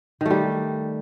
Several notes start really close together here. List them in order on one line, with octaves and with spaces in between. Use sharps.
D#3 A3 G3